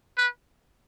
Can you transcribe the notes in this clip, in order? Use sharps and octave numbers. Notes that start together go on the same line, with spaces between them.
B4